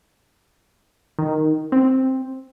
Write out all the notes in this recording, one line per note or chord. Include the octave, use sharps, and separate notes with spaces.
D#3
C4